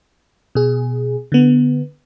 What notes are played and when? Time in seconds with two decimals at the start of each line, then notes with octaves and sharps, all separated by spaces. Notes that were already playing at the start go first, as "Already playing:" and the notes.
0.55 B2 G#4
1.32 D3 B3